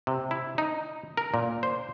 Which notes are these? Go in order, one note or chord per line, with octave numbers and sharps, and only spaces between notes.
C3
E4
D#4
A#4
A#2
C5